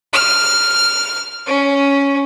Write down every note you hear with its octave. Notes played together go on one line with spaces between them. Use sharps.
F6
C#4